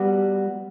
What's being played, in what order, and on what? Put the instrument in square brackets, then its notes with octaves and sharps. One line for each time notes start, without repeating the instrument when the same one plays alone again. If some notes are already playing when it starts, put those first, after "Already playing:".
Already playing: [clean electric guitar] G3 B3 F#4